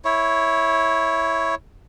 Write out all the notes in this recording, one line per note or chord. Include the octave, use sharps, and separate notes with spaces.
E4 C#5